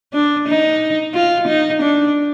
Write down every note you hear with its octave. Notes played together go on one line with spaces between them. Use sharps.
D4
D#4
F4
D#4
D4